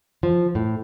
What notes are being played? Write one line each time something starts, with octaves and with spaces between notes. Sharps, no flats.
F3
A2